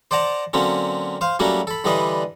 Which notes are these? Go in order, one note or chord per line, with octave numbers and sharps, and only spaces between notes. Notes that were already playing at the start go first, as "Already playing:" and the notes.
C5 D5 F#5 A5 A#5
D3 F#3 A#3 C4 C#4
C5 F5
F#3 G3 A3 A#3 C#4 F#4
A4 B5
D3 E3 G3 D4 D#5 B5